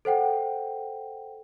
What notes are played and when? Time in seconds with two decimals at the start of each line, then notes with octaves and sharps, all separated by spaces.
0.05 A4 C5 F#5 G5